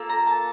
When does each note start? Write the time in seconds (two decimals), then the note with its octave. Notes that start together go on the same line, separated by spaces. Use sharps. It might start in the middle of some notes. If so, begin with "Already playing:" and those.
Already playing: A#3 F4 A4
0.10 A#5
0.27 A5